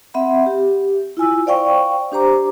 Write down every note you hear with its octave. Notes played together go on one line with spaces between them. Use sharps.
C4 E5 F#5 B5
G4
E4 F4 G#5 E6
C5 D5 F5 G5 C#6
D4 G4 C5 A#5 D6